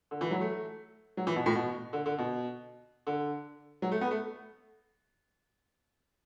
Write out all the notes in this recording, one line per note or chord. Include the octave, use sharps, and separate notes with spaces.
D3
E3
F#3
A3
F#3
E3
B2
A2
B2
D3
D3
B2
D3
F#3
A3
B3
A3